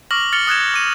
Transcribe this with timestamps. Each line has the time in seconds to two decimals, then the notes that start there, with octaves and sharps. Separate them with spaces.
0.11 C#6 D6 F6 A#6 F#7
0.32 F6 A6 C#7 F7 G7
0.47 D#6 F#6 G#6 E7
0.74 D6 D#7